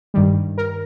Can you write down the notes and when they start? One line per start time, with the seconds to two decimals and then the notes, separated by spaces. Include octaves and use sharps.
0.14 G2 D#3 G3
0.58 A#4